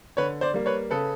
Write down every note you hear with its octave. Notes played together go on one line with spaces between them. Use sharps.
D3 B4 C#5
C5 D5
G3 A#3
B4 C#5
C#3 A4 B4